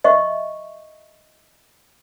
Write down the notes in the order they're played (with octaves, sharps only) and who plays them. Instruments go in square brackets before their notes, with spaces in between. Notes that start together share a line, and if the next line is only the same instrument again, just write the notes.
[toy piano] D#5 E5 C#6